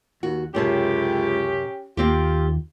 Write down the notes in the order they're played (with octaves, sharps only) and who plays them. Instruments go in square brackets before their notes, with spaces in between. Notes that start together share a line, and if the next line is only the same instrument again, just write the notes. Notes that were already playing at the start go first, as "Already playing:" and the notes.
[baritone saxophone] D#2 [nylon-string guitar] F#4
[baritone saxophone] C#2 [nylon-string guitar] F#2 C3 A5 [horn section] C#4 G4
[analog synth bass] D#2 [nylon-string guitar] A#3 C4 G4 [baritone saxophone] F4